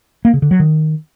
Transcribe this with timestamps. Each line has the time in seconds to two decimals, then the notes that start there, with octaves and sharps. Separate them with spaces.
0.25 A#3
0.33 C#3
0.42 D3
0.51 F#3
0.60 D#3